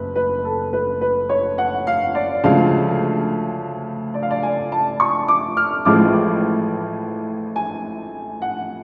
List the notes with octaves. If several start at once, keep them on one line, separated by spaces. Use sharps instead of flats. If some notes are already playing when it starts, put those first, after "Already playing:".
Already playing: F#1 B4
B4
A4
B4
B4
C#5
F#5
F5
D5
D2 C#3 F3 G#3 F5
D5
F5
D5
G#5
A5
C#6
D6
F6
A1 A2 F3 G#3 D6
G#5
F#5